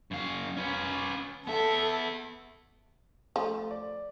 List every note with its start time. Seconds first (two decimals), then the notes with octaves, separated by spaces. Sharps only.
0.11 F#2 F5
0.57 C#4 B4
1.47 B3 A4 E5
3.36 F3 A3
3.71 D5